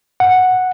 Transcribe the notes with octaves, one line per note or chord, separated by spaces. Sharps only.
F#5